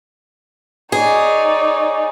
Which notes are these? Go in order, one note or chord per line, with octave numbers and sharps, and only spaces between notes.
D#4 G#4 C#5 D5